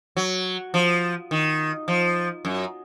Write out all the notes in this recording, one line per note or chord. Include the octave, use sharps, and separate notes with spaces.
F#3
F3
D#3
F3
F#2